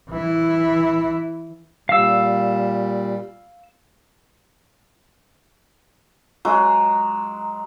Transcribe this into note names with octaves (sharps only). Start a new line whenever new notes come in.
E3 E4
A#2 G3 F5 E6
F#3 G#3